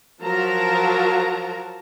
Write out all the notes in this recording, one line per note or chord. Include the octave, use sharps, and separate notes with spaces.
F3 F#3 A#4 A5 A#5